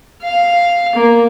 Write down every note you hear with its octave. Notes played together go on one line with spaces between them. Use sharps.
F5
A#3